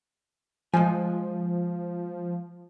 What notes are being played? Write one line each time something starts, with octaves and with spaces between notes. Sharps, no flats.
F3 G#3 G#5